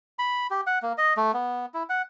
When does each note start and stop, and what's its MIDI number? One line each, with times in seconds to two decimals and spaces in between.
0.19 0.47 83
0.50 0.61 67
0.67 0.79 78
0.82 0.93 58
0.98 1.13 75
1.17 1.32 57
1.33 1.66 59
1.74 1.83 64
1.89 2.02 78